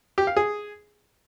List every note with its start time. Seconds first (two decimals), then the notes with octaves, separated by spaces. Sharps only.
0.18 G4
0.27 F5
0.37 G#4